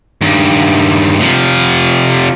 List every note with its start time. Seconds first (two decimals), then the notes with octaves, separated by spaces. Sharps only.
0.21 G2 D#3
1.19 C3 F3